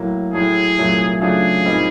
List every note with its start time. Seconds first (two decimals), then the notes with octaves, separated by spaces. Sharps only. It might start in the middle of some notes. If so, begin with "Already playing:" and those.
Already playing: A2 F#3 A#3
0.33 A2 F#3 A3 G#4
0.78 C2 A#2 F#3 A3
1.21 C#3 F#3 A3 D4 F4 G#4
1.65 A#2 G3 C4 D#4